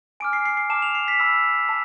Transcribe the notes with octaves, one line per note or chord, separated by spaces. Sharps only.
G#5 D6 F6 D7
C7
C7
C7
A5 D6 F6 E7
F7
C7
B6
B5 E6
A5